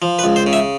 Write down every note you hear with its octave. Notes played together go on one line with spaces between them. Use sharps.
F3
B4
C#2
C5
C#3
E5